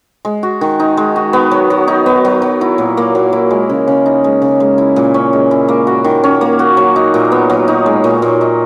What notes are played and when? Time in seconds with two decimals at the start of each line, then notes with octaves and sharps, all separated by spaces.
0.25 G#3
0.43 F#4
0.61 D#3
0.80 D#4
0.97 G#3
1.16 F#4
1.33 B3
1.51 F#3
1.70 F#3
1.88 D#4
2.06 B3
2.25 F#3
2.42 F#3
2.61 E4
2.78 A#2
2.97 A#3
3.15 F#3
3.33 E4
3.51 G#3
3.69 C#3
3.88 C#3
4.06 D#4
4.24 G#3
4.42 C#3
4.60 G#3
4.78 E4
4.96 A#2
5.14 C#4
5.33 G#3
5.51 E4
5.68 A#3
5.87 F#4
6.04 D#3
6.24 C#4
6.41 A#3
6.59 F#4
6.77 F#3
6.96 D#4
7.14 A#2
7.32 B3
7.49 F#3
7.68 D#4
7.86 G#3
8.04 A#2
8.22 A#2
8.41 D#4